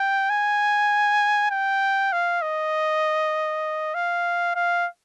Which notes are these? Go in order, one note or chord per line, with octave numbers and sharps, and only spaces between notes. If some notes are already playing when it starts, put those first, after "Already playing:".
Already playing: G5
G#5
G5
F5
D#5
F5
F5